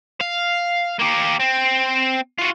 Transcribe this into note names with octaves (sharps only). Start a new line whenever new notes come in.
F5
A#3 G4
C4
F4 F#4